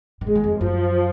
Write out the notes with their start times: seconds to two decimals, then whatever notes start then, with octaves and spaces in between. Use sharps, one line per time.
0.21 D#3
0.27 C#3 G#3
0.35 D#3
0.44 F2
0.60 F#2 F3